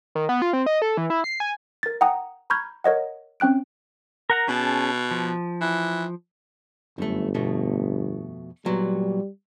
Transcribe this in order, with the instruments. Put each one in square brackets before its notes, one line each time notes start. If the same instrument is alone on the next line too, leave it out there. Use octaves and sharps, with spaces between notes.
[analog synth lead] D#3
B3
F4
C4
D#5
A4
E3
E4
C7
G#5
[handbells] A#4 A6
F#5 G5 A#5 D#6
A#5 B5 C#6 F6 G6 G#6
A#4 C#5 D#5 F#5
C4 C#4 G5 F#6 D7
[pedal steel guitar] A#4 F#5 A#5
[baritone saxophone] B2 [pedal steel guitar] C#4 G#4 A5
[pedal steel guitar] F3
[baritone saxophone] E3
[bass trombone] G1 [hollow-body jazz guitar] F#2 A3
[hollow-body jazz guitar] F2 B2 A3
[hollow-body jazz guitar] A#2 F#3 B3 [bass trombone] G3